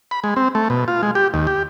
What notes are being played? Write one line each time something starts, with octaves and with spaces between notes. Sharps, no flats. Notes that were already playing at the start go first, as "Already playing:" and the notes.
B5
G#3
C4
A3
B2
F4
G#3
G4
D#2
G4